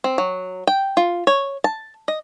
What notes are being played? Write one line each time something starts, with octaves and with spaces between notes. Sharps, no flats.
C4
F#3
G5
F4
C#5
A5
D#5